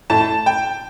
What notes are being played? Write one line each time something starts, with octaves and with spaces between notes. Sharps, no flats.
A2 A5
G5